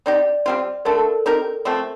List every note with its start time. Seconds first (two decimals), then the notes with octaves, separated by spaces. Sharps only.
0.06 C4 D#4 G4 D5
0.46 G3 C4 F4
0.85 D3 A3 D4 A#4
0.96 A4
1.26 C4 D#4 G4 A#4
1.65 F3 A3 C4